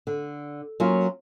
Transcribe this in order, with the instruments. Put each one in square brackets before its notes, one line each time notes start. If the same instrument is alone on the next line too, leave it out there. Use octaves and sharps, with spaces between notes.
[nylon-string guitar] D3
F#3 A#3 C#4 F4